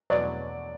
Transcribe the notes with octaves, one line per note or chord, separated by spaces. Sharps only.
E2 B2 F#3 D5